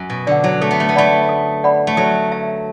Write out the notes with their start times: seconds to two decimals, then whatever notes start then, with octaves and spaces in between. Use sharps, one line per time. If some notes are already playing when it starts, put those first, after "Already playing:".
Already playing: F#2
0.10 B2
0.27 D3 D5 F#5
0.44 F#3
0.61 A3 A4
0.71 B3
0.80 A3
0.89 B3
0.95 A3 D5 F#5 B5
1.29 A4
1.64 D5 F#5 B5
1.87 A3
1.97 F#3 A4
2.32 E5 A5